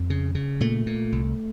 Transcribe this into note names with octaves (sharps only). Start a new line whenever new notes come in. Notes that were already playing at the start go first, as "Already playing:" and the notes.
Already playing: F2
C#3
C#3
A#2 A3
A#2
C2